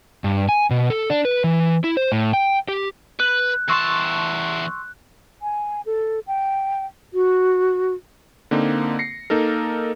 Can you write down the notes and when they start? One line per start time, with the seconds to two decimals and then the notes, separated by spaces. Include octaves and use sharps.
0.24 G2
0.49 G#5
0.70 B2
0.90 A4
1.10 D4
1.25 B4
1.44 E3
1.84 E4
1.97 C5
2.12 A2
2.33 G5
2.68 G4
3.20 B4 F#6
3.69 E2 A5 C6 C#6 E6
5.41 G#5
5.86 A4
6.27 G5
7.14 F#4
8.51 D3 A#3 C4 D#4
8.99 A#6 C7 C#7
9.30 A#3 D#4 A4 A#4